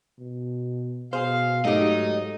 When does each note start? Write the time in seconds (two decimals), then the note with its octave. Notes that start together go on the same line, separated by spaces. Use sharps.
0.19 B2
1.13 B2 G#4 C5 F5
1.65 G#2 F#3 A3 D#4 G4 D#5